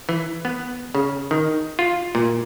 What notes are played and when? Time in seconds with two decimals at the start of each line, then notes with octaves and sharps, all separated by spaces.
0.09 E3
0.45 B3
0.95 C#3
1.31 D#3
1.79 F4
2.15 A#2